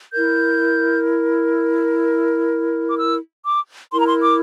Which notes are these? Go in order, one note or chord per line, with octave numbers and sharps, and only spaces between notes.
E4 A#4 G6
D6
E6
D6
E4 A#4 C6
A#5
C6
D6